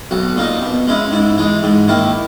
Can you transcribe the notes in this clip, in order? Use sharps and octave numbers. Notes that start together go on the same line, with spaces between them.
B1 F#4
A#2 A#3 D#4
B2
G#3 C#4 E4
G#2 E4
E3 G#3
G#2
D#3 A#3 E4